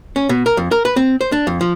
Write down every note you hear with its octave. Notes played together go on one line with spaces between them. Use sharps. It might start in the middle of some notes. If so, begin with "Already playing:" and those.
C#4
B2
A#4
F2
A#4
B4
C4
C5
D4
F2
F3